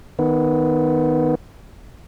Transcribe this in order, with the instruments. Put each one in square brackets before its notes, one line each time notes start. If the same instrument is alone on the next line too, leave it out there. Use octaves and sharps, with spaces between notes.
[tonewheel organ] D#3 B3